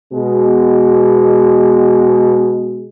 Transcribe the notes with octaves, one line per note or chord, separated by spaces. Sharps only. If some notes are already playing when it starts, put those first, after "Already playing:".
B2 G#3